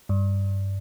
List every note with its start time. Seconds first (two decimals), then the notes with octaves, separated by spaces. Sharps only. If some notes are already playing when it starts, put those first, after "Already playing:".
0.09 G2